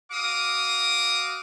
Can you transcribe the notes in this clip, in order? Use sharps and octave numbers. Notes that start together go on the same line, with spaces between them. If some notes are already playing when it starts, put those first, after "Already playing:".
F#4 F5 D6 D#6